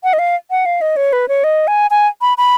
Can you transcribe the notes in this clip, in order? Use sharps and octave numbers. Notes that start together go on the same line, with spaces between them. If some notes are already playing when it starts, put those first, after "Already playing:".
F#5
D#5
F5
F#5
F5
D#5
C#5
B4
C#5
D#5
G#5
G#5
B5
B5